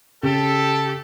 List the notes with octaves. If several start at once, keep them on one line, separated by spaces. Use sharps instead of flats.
C#3 G4 A4